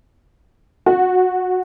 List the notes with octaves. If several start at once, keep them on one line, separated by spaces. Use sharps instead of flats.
F#4